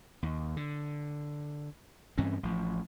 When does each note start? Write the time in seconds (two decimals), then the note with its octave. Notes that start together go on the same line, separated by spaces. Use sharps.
0.23 D#2
0.57 D3
2.18 G2 E3 C4 C#4
2.43 A1 F3